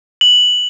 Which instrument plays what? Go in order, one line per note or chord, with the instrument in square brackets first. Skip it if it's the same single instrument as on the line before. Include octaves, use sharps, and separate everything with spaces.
[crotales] F#7